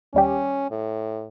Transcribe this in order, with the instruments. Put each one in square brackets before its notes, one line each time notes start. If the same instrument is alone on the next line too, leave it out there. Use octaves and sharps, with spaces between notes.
[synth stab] D#2 G3 G4 [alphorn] C#4
[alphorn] A2